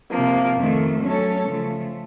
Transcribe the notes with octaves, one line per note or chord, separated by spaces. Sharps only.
C3 F3 A#3
F2 D#3 A3
F#3 A3 C#4 A4 C#5
C#3 F3 A3